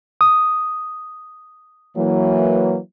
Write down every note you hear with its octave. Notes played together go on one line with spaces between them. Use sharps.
D#6
E3 F#3 A#3